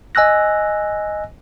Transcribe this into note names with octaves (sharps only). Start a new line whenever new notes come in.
D#5 G#5 E6 F#6 A#6